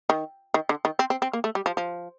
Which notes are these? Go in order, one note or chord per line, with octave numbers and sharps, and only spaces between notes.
D#3
D#3
D3
D#3
C4
C4
C4
A#3
A3
G3
F3
F3